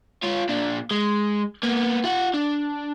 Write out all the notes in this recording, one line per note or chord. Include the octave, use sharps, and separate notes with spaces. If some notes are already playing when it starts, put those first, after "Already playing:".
F4 C#5
A#2 D4
G#3
A#3 B3
F4 F#5
D4